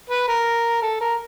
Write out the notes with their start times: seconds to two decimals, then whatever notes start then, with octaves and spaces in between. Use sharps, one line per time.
0.09 B4
0.28 A#4
0.82 A4
1.01 A#4